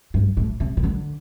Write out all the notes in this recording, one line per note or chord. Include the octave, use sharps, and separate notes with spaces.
G2
A2
C3
C3
D3